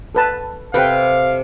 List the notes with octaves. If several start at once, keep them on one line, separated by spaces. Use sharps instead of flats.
A4 B4 A5
C3 G4 A4 B4 F5 G5